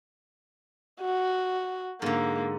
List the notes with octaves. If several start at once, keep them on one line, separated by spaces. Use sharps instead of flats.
F#4
G#2 D3 A#3